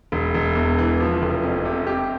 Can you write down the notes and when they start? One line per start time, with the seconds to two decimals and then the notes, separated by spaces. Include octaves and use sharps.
0.12 E1
0.34 E1
0.56 E2
0.78 E3
1.00 F3
1.22 F1
1.43 F2
1.65 C3
1.87 G4